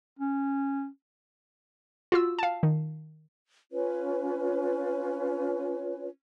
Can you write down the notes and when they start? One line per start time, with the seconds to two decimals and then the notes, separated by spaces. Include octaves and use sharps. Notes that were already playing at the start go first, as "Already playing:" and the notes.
0.19 C#4
2.12 F4 F#4 E6
2.39 F5 A5
2.63 D#3
3.72 C#4 F4 B4 C#5